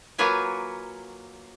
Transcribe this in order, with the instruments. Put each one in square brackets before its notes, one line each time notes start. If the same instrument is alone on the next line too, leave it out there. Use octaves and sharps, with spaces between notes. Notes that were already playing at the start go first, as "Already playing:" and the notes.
[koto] F#3 A#3 F4 B4 C#5 G#5